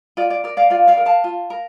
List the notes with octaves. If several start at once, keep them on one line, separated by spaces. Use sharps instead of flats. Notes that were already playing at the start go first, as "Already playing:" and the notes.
F4 D5
D5
A#4 D5
D5 F5
F4 D5 F5
D5 F5
A#4
F5 A5
F4
A#4